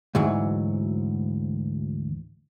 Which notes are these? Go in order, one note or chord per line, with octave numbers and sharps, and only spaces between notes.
D2 G#2 E3 F#3